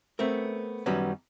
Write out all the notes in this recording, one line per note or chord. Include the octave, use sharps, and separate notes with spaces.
A3 B3 C4 A#4
F#2 D#3 F#3 G3 B3 C#4